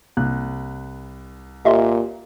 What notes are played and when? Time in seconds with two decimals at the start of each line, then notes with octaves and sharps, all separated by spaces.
0.17 C2 A#3 F#6
1.65 A#2 G4 D#5 E5 C6